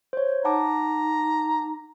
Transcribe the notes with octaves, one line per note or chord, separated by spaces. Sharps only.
C5 C#5
D#4 F#5 A5 A#5 D6